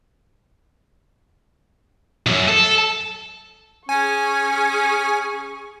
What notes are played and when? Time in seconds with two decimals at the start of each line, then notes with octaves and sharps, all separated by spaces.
2.26 B1 F#2
2.48 A4
3.89 C#4 G#4 G#5 C#6